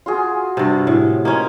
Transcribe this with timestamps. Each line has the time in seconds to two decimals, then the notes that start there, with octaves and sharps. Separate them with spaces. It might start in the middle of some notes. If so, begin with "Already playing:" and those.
0.06 F4 F#4 G#4
0.57 G2 C3
0.87 A2
1.25 A#3 C#4 D#4 C5